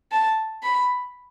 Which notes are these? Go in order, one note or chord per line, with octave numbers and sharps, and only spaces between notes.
A5
B5